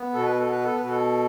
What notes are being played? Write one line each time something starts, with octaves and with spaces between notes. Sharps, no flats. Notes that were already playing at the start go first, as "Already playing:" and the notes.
Already playing: B3
B2 A4
B4
A4
B3 B4
A4
B2 B4
A4